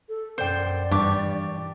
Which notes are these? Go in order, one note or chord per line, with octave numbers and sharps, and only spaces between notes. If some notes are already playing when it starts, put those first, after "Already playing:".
A4
A#1 F#2 C5 D5 G5
G2 E3 G4 C#6 D6 A6